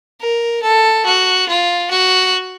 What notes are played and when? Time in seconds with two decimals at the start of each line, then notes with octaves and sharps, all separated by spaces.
0.21 A#4
0.62 A4
1.06 F#4
1.48 F4
1.90 F#4